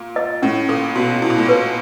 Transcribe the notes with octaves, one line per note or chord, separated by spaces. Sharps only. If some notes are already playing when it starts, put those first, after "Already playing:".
Already playing: A#2
D#5
A2 C#4
A#2 A4
B2 F#4
B2 E4
A#2
A2
A#2 B4